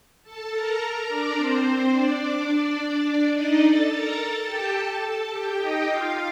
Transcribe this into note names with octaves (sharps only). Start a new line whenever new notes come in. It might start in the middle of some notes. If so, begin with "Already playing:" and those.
A4 A5
A#4 A#5
A#4 A#5
D4 D5
C4 C5
C4 C5
D4 D5
D4 D5
D4 D5
D#4 D#5
A4 A5
A#4 A#5
A4 A5
G4 G5
A4 A5
A4 A5
G4 G5
D#4 D#5
F4 F5